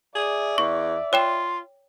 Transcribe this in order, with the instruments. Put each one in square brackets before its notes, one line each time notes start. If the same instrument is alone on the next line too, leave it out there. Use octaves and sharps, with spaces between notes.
[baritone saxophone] G#4 [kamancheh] D5 [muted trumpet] E5
[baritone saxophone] E2 [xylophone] C#6
[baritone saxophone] F4 [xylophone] C#5 G5 E7